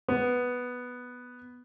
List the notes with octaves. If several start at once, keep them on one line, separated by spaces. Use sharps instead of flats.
B3